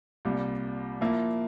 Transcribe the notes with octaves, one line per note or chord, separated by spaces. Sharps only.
C2 A#2 G3
A#2 F3 A#3 E4